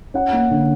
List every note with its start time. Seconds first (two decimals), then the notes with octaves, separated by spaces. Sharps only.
0.14 C#4 F#5
0.33 A#3
0.51 D3